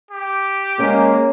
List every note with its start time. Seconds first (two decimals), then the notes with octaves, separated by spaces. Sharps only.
0.11 G4
0.79 G#3 A#3 C#4